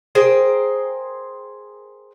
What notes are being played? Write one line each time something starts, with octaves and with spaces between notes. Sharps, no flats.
G#4 A#4 C5 G5